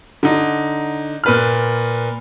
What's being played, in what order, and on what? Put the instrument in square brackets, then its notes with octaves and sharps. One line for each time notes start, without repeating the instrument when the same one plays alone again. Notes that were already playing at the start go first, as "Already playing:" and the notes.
[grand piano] D3 D#4
A#2 B4 F6